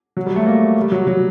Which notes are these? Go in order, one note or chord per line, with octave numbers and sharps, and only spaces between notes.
F#3
G3
A3
A#3
G3
F#3
F#3